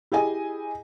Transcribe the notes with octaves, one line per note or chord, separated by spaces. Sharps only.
E4 G4 G#4 D#5 G#5